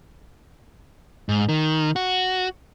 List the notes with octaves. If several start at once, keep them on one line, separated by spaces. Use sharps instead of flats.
G#2
D#3
F#4